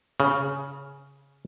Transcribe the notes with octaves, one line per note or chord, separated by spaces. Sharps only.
C#3